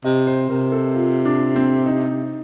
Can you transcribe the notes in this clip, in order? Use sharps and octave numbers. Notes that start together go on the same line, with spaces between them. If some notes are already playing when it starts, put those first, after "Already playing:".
C3 D#5
C5
C3 A#4
A4
F4
D4
C4
D#4